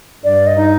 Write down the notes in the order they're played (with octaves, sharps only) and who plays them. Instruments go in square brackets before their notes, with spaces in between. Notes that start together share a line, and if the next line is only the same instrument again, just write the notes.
[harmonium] G2 [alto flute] D5
[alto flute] D#5
[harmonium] D#4